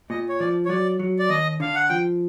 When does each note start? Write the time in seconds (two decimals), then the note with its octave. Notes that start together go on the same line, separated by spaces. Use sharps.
0.10 A#2 D#5
0.29 C#5
0.40 F3 D5
0.65 C#5
0.69 F#3 D5
0.99 F#3
1.19 D5
1.29 D#2 D#5
1.60 D3 F5
1.75 F#5
1.89 F3 G5